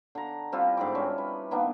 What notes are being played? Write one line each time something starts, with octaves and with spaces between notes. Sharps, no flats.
D3 A#5
G3 C4 E4 F4
G#2 D3 C6 D6
G3 C#4
B4
D#3 A#3 B3 D4